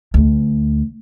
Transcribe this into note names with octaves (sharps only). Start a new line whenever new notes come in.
D2